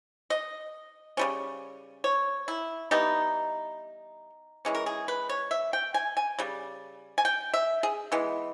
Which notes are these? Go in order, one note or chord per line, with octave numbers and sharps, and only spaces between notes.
D#5
C#3 G3 C#4
C#5
E4
E3 G3 B3 D#4
E3 G#3 C#4
A#4
G#4
B4
C#5
E5
G5
G#5
G#5
C#3 G3
G#5
G5
E5
G#4
E3 G#3 B3